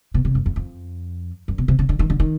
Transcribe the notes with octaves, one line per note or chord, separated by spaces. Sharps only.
B2
C3
F#2
F2
F2
F#2
B2
C3
C#3
D3
D#3
D3
D#3